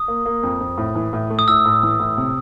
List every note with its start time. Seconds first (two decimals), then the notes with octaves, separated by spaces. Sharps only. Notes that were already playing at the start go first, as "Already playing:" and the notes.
Already playing: D#6
0.08 A#3
0.26 A#3
0.43 F2
0.60 F2
0.78 A2
0.95 E3
1.13 A2
1.30 A3
1.39 D#6
1.48 A2 E6
1.66 A2
1.83 E3
2.00 A2
2.17 C3